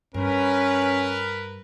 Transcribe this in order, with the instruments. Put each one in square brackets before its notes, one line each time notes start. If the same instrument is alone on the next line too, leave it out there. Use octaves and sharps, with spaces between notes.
[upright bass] G2 [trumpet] C#4 [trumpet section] A#4 B4